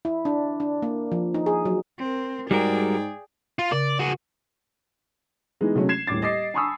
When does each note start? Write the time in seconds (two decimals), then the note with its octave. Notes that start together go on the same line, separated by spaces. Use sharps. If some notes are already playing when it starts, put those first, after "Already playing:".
0.05 E4
0.25 D4
0.60 D4
0.82 A#3
1.12 F3
1.34 D#4
1.46 G#4
1.65 F#3
1.98 C4 A#4
2.51 G#2 G3 F#4 G#4 A#4 D5 G5
3.59 F4
3.72 C#3 D5
3.99 F#4 G#4
5.61 E3 G#3 B3 D#4 E4
5.75 C3 F#3 G#3 A3 C#4
5.89 G#6 C7 E7
6.07 D#1 A2 D6 A6
6.21 G4 D#5 D6 C7
6.54 G#5 A5 B5 C#6 D#6 E6